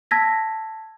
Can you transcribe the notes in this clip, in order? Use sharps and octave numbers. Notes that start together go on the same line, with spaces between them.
A5 E6 G#6 A#6 B6